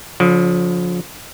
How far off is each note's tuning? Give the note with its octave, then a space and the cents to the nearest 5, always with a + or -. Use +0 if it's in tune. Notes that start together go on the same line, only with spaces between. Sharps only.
D3 -40 F3 +30